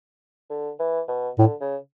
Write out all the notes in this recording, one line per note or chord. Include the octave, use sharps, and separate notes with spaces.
D3
E3
B2
A2 D3
C#3